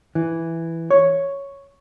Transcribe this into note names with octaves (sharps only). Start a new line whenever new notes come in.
E3
C#5